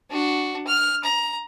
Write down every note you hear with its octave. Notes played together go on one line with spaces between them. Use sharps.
D4 F#4
F6
A#5